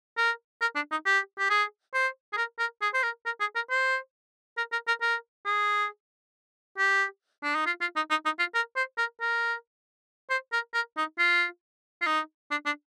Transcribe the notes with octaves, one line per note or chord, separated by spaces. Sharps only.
A#4
A#4
D4
D#4
G4
G4
G#4
C5
G#4
A#4
A#4
G#4
C5
A#4
A#4
G#4
A#4
C5
A#4
A#4
A#4
A#4
G#4
G4
D4
D#4
F4
F4
D#4
D#4
D#4
F4
A#4
C5
A#4
A#4
C5
A#4
A#4
D#4
F4
F4
D#4
D4
D4